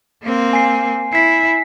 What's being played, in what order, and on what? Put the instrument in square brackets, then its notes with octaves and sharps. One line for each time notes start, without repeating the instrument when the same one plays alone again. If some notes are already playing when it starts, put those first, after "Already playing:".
[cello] A#3 C4
[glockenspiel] G#5 C7
[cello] E4 [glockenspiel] B6 C7